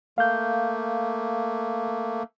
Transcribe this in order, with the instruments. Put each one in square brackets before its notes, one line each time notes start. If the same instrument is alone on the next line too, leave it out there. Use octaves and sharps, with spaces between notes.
[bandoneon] A3 A#3 [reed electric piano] F5 G6